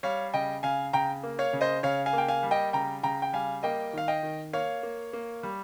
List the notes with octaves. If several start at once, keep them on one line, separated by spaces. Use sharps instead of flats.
G3 C#5 F5
C#3 D#5 G5
C#3 F5 G#5
C#3 G5 A#5
A#3
C#5 F5
C#3
C5 D#5
C#3 C#5 F5
F5 G#5
A#3 G5
F5 G#5
G3
D#5 G5
C#3 G5 A#5
C#3 G5 A#5
G5
G3 F5 G#5
A#3 D#5 G5
D#3 F5
D#5 G5
D#3
A#3 C#5 F5
A#3
A#3
G3